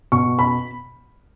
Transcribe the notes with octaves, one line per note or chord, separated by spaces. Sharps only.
B2 C#6
B5